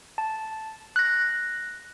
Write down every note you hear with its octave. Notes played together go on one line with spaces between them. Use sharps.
A5
F#6 A#6